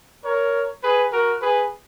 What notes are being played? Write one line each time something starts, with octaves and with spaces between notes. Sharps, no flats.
A#4 C#5
G#4 B4
F#4 A#4
G#4 B4